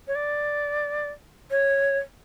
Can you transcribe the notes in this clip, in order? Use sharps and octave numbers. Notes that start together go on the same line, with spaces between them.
C#5
D5
C#5